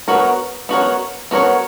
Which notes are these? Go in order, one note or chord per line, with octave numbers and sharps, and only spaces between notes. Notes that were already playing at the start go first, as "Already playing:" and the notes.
B3 F#4 A#4 C#5
B3 F#4 A#4 C#5
B3 F#4 A#4 C#5